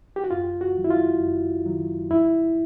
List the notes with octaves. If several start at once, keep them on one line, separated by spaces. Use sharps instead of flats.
G4
F#4
F#2 F4
F#4
D#3 F#3
E4
F4
F#2
D#3 F#3
F2 E4